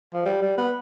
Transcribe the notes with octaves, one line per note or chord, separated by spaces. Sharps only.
F3
G3
G3
B3